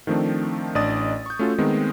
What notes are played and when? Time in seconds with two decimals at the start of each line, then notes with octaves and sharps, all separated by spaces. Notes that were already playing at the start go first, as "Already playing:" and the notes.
0.07 D#3 F3 A3 C4 D4
0.75 A1 D4 D5 D#5 D#6 A6
1.26 C#6 G6
1.39 A3 C#4 F4 F#4 A4
1.58 D#3 G#3 A3 B3 C4